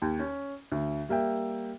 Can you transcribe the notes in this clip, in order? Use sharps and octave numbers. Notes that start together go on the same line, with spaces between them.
D#2
C#4
D2
G3 A#3 E5 G5